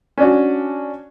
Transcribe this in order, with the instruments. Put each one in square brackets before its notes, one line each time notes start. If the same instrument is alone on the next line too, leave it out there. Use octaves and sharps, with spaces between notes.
[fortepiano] C#4 D4 F#4